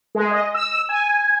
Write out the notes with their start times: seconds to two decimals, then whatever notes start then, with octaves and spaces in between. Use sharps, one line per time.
0.15 G#3
0.31 D#5
0.54 E6
0.89 G#5